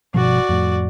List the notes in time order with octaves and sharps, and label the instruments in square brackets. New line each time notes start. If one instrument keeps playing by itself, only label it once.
[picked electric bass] G1 B2 F3 [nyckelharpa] F#4 D5
[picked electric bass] F2 A2